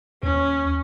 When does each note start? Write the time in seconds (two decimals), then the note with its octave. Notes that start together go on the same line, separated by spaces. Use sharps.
0.23 D#2 C#4